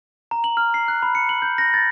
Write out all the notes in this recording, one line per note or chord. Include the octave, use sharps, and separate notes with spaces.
A#5
F#7
F6
C7
F#6
B5
C#7
F#7
G6
A#6
A6